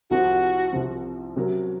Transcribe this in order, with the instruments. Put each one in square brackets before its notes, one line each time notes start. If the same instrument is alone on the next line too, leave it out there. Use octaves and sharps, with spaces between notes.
[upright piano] C2 C3 F3 [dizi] F#4
[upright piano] C2 C3 F3
C3 F#3 C#4 F#4 A#4